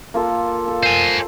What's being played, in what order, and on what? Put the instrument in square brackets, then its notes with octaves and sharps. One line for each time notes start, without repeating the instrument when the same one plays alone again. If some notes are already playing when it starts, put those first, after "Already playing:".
[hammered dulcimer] A#3 F4 A4
A4
[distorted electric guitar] C5 G#5